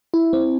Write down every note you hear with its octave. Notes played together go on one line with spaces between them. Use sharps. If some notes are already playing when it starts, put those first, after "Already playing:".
E4
C4